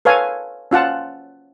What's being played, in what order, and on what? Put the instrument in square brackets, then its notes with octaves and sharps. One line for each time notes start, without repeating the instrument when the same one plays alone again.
[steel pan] A4 B4 C#5 F5 G#5
C#4 F4 F#5 A5